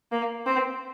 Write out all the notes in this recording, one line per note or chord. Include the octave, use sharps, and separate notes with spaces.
A#3
C4